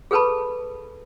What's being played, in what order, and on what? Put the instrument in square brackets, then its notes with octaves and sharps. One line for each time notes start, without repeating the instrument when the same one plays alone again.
[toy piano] G#4 A4 B4 A5 B5